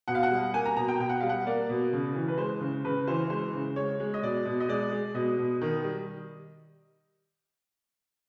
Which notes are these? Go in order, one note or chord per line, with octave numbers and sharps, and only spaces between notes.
B2 F#5
F5
F#5
G3
A#3 G#5
A#5
B2 A#5
G5
B2 G5
F#5
G3 F5
F#5
A#3 D5
B2
C#3
E3
B4
G#3 C5
C#3
C#3 B4
E3 C5
G#3 C5
C#3
G#3 C#5
G#3
D#5
B2 D5
B2
D#5
G#3 D5
G#3
B2 D#5
B2
D#3
G3